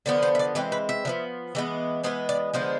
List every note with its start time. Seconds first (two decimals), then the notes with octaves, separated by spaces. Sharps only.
0.06 D3 F3 B3 D5
0.23 C5
0.35 E5
0.39 D5
0.55 E3 G#3 C4 B4
0.72 B4
0.89 E5
1.05 D3 F3 B3
1.55 E3 G#3 B3
2.04 E3 G#3 B3 C5
2.29 D5
2.54 D3 F3 G#3 B3 C5